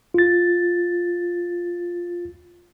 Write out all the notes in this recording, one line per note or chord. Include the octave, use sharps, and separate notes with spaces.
F4 A6